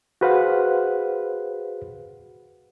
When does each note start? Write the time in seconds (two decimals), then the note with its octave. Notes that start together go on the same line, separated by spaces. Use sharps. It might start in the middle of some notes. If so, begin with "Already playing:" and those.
0.21 F#4 G#4 B4 C5 F5 F#5